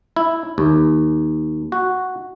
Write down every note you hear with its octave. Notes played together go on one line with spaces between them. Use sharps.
E4
D#2
F#4